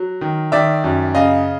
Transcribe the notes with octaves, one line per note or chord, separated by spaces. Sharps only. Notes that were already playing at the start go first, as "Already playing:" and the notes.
Already playing: F#3
D#3
D#3 D5 E5
F#2
C#3 D#5 F5